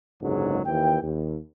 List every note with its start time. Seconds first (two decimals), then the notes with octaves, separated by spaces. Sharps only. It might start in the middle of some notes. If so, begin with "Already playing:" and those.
0.21 F#1 C#2 G#2 D3 F#3
0.65 D#2 E3 G5
1.02 D#2